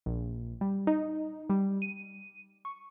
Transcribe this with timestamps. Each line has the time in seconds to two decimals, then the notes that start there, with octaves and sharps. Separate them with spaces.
0.06 A#1
0.61 G3
0.87 D#4
1.50 G3
1.82 D#7
2.65 C#6